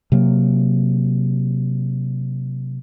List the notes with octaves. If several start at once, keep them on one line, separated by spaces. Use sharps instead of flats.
C3 F#3 A#3